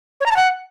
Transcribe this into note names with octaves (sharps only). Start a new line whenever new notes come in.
C#5
A#5
A5
F#5